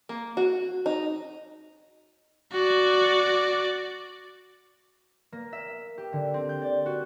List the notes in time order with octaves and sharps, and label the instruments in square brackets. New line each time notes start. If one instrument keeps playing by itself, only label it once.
[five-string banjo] A#3
F#4
D#4
[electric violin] F#4 D5
[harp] A#3
E5
G4
D3
C4
G6
D5
F#4